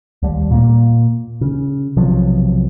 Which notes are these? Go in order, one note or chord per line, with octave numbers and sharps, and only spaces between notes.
D#2 G3
A#2 A#3
C#3
B1 C3 F3 F#3